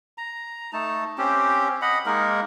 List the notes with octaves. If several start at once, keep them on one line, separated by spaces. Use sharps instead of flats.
A#5
A3 D#4 A5
C4 C#4 G4
D#5 F#5 B5
G#3 A#3 D#4 A#4